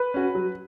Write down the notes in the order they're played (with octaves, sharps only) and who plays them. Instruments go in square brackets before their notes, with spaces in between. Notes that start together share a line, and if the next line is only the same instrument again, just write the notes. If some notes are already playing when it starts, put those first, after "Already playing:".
Already playing: [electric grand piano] B4
[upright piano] C#4 F#4
F#3